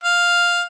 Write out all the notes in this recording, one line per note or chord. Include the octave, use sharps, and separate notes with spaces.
F5